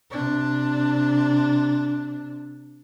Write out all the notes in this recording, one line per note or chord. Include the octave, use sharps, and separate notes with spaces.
C3 D4